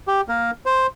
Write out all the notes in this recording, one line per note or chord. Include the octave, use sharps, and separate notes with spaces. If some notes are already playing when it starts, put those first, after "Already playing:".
G4
A#3 A#4
C5